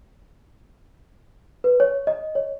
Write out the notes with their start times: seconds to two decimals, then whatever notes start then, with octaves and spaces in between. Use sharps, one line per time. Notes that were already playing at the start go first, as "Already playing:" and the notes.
1.64 B4
1.80 C#5
2.07 D#5
2.35 C#5